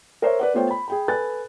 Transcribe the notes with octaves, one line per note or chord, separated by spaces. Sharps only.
A#4 C5 C#5 E5
B4 D5 F#5
A3 B3 F4 C5 C#5 G5
B5
G#4 G5 B5
A4 B4 G#5 B5 F#6 A6